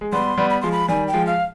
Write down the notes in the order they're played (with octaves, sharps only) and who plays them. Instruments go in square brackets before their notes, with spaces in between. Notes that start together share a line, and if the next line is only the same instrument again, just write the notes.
[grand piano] G#3
[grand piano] G3 B3 [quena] C6
[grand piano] G3 B3
[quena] B5
[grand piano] F3 G#3 [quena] C6
[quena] B5
[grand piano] D#3 G3 [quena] G#5
[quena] G5
[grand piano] F3 G#3
[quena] F5